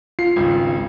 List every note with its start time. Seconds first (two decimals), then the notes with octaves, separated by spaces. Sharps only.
0.19 F4 C7
0.36 G#1 C#2